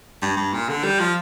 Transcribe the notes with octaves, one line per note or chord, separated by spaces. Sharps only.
G2
G2
A#2
D3
G3
F3